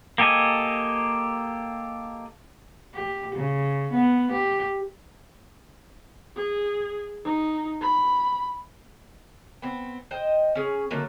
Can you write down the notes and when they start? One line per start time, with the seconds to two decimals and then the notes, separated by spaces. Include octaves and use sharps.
0.18 A#3 G4 A4 D#5 G#5
2.95 G4
3.35 C#3
3.93 B3
4.32 G4
6.36 G#4
7.25 D#4
7.81 B5
9.62 B3 C4
10.11 C5 D#5 G5
10.55 C#4 G#4
10.91 D3 F#3 A3 A#3